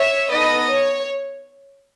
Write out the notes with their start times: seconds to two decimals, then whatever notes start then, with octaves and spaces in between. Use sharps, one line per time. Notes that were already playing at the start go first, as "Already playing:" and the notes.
Already playing: C#5 E5
0.31 B3 D#4 A4 B4 D#5
0.70 C#5